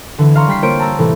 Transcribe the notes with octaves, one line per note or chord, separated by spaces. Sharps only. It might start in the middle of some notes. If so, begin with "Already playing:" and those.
D3 E3
F5 A#5 C6 C#6
G3 G5 B6 C7
A#3 F4 C5 C#5 G6 D7
A5 A#5 E6 A#6
A2 C3 E3